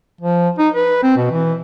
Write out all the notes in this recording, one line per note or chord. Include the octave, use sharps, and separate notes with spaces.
F3
D#4
B4
C4
B2
E3